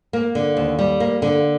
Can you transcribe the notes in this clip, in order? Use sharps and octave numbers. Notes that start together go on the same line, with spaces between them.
A#3
D3
D#2
G3
A#3
D3